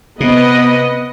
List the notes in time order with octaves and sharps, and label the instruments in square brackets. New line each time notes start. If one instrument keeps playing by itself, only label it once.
[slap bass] C3 [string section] B3 [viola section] B4 D#5